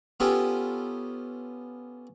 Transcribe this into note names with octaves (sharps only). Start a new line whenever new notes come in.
B3 C#4 F4 G4 A4